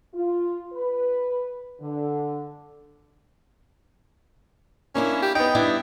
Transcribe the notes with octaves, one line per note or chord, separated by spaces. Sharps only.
F4
B4
D3
A#3 C#4 D4 E4
G4
B3 D#4 G5
G3 D4 E4